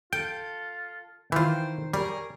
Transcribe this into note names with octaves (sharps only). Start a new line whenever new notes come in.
F4 A4 G5
D#3 E3 F4 C5 G5
G3 G#4 A#4 C#5